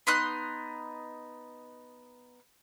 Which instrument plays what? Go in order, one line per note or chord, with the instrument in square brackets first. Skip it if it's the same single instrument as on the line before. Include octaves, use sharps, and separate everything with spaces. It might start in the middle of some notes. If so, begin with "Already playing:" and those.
[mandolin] B3 D#4 C6 F#6